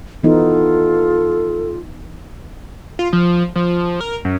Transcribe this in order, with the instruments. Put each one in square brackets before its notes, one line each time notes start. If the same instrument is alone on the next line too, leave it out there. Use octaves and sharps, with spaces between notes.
[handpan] E3 B3 D#4 [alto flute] F4 [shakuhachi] A4
[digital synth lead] F4
F3
F3
A#4
F#2